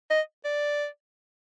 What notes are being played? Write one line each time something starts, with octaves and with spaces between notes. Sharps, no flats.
D#5
D5